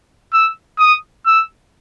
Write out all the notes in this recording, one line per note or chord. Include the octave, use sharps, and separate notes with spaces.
E6
D#6
E6